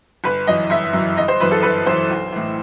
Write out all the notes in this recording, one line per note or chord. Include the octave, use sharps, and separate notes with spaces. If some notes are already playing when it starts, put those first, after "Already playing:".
G1 B4
F#2 E3 D#5
G1 E5
F#2
E3
G1 D#5
C5
F#2 E3 B4
A4
G1 B4
F#2 E3 C5
B1
A2 E3